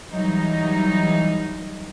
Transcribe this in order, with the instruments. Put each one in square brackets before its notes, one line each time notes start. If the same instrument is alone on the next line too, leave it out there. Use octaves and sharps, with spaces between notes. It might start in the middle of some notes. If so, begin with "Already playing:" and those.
[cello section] E3 F#3 G3 D#4